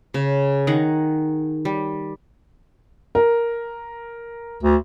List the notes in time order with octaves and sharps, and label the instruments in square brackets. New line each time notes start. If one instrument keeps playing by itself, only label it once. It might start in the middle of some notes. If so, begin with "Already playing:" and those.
[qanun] C#3
D#3 G#4 F#5 A#5
G3
[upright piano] A#4
[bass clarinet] D2